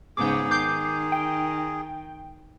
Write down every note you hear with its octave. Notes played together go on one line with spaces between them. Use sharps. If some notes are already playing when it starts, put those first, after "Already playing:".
G#2 C#3 B3 G#4 D6 G6
D#3 D6 G6 C7
G5